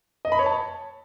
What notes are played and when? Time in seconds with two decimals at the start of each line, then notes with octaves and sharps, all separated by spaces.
0.25 D#5
0.32 B5
0.39 C#5
0.46 A5